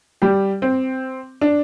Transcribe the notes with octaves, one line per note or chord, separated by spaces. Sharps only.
G3 G4
C4
D4